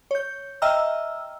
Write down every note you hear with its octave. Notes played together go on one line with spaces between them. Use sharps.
C#5 G6
D#5 E5 G5 A#5 E6 F6